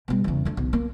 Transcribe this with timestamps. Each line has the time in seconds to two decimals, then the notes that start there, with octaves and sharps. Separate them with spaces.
0.08 B2 G3
0.24 E2 C#3
0.45 D3 A3
0.57 B1
0.73 A#3